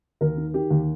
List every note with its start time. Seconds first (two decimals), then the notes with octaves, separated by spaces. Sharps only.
0.21 D#2 A#4
0.37 D#3
0.54 D#3 G4
0.71 D#2